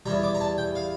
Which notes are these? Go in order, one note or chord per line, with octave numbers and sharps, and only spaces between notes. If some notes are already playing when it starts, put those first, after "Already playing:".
E2 E3 G3 A#5
D6
A#5
A5
G5
F5